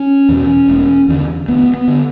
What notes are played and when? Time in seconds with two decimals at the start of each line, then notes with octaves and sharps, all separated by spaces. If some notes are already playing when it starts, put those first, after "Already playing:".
Already playing: C#4
0.29 E2 B2
0.69 E1
1.08 E2 D3
1.48 D2 B3
1.74 B3
1.87 D3